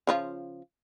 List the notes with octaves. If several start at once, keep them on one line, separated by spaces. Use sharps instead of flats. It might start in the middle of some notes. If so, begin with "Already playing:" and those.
C#3 F3 F4